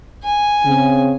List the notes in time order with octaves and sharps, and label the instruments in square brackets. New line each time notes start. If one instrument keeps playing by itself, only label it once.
[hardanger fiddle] G#5
[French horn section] C#3 C4